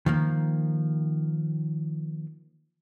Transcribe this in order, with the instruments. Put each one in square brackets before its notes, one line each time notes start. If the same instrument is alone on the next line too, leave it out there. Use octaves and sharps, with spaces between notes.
[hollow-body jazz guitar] D#3 F3 A#3